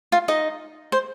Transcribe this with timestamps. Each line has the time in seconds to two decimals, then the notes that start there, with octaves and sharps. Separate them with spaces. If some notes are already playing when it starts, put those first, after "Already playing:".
0.12 F4 F5
0.28 D#4 D#5
0.92 C5